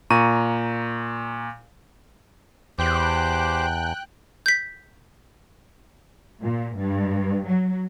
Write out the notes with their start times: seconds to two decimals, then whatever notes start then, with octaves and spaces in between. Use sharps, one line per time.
0.10 A#2 A#5 C#6 D#7
2.79 E2 G4 C5 G5 D6 F#6
4.46 G6 B6
6.43 A#2
6.77 G2
7.48 F#3